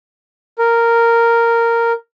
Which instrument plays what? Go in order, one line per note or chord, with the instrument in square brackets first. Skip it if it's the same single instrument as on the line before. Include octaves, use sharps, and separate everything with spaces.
[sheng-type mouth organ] A#4